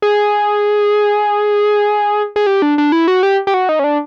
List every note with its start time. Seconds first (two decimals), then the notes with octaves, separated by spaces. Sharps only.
0.02 G#4
2.36 G#4
2.47 G4
2.62 D4
2.78 D4
2.92 E4
3.08 F#4
3.23 G4
3.47 G4
3.54 F#4
3.69 D#4
3.79 C#4
3.84 D4